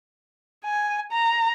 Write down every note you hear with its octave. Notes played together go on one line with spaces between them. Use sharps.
G#5
A#5